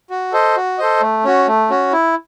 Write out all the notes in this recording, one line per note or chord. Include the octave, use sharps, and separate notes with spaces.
F#4
A4 C5 D#5
F#4
A4 C5 D#5
A3
C#4 F#4
A3
C#4 F#4
E4